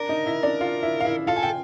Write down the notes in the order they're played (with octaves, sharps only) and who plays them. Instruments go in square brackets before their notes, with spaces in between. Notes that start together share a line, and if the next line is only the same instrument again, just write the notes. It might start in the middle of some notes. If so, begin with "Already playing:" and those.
Already playing: [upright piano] D4 D5 [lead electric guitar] A#4
[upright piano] D#4 D#5
E4 E5
D4 D5
F4 F5
E4 E5
F5
E4 E5
[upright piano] F4 F5 [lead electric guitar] A4
[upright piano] G#5
G5